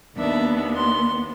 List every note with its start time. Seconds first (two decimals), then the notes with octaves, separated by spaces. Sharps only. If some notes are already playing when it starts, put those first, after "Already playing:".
0.16 D#2 B3 D4 E5
0.76 C6